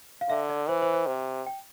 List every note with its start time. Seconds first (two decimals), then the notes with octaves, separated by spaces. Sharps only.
0.21 F5
0.29 D3 E5
0.49 D5
0.68 E3 C5
0.82 C5
0.94 C5
1.07 C3
1.46 G5